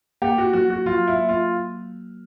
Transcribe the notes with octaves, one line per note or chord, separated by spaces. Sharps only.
A#3 G4
F#4
F#3 F#4
F#4
F#3 F4
E4
A#3
F4